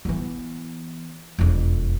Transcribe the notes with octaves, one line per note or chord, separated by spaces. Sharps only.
E3 B3
E1 F2